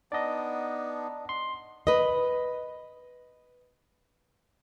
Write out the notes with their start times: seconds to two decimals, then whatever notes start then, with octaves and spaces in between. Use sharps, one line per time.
0.12 B3 D4 D#4 D5 D#5
1.29 C6
1.87 B4 D#5